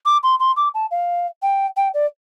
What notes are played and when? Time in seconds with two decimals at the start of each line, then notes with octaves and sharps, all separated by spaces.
0.05 D6
0.23 C6
0.39 C6
0.56 D6
0.74 A5
0.91 F5
1.42 G5
1.76 G5
1.94 D5